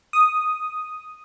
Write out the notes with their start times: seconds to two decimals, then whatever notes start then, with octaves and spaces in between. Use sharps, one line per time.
0.13 D#6